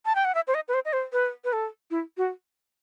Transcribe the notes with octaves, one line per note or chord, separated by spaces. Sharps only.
A5
G5
F#5
E5
C5
D#5
B4
C5
D#5
C5
B4
B4
A4
E4
F#4